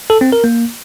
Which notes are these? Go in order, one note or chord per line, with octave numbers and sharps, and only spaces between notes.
A4
C4
A#4
A#3